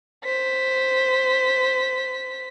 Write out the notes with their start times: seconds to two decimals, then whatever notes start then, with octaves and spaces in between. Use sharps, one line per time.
0.25 C5 B6